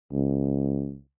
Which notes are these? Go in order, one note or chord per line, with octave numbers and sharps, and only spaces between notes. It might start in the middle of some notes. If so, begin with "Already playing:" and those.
C#2